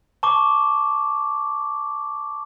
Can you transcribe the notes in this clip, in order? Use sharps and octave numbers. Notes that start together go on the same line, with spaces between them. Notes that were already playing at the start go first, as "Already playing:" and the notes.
A5 C#6 D6